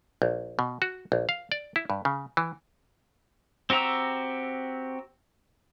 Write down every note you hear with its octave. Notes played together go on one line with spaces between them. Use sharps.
A#1
B2
F#4
A#1
F5
D5
E4
G2
C#3
E3
C4 F#4 G4 A#5 E6